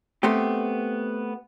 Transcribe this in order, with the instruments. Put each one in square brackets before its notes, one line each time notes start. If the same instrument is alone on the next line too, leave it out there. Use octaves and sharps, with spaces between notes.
[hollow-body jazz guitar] A3 B3 C4 G4